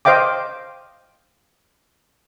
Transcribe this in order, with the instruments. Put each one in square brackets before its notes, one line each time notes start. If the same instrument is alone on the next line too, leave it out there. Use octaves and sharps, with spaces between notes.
[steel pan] C5 D#5 F5 G5 D6